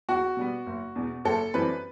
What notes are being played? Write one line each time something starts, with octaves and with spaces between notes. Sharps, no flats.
E2 F#4
B2 G3 B3
F#1
E2 B2
F#1 A4
F#2 E3 G3 C4 B4